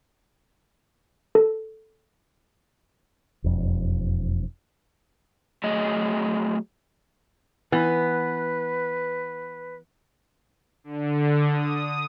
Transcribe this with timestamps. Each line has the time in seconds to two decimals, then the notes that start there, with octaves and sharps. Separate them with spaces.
1.35 A4
3.44 E1 F2
5.64 F#3 A3 G#4 D#5
7.72 E3 B3 B4
10.84 D3
11.46 D#6